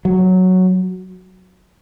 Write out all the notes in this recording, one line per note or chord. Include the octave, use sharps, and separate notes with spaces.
F#3